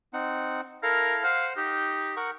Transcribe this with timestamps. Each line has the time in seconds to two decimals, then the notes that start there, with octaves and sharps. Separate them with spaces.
0.13 C4 D#4 F#5
0.83 E4 A4 A#4 F5
1.23 C5 F5 F#5
1.57 D#4 G4
2.17 A#4 F#5 C#6